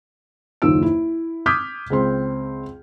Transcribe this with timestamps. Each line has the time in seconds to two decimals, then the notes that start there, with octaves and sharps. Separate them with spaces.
0.62 F#1 D#2 D#3 F4 E6 D7
0.82 E4
1.46 D6 D#6 F6 G6 G#6 B6
1.90 C#2 C4 C6